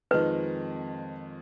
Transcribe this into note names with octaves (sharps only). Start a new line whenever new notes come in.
F2 D#3 G#3 D#4 B4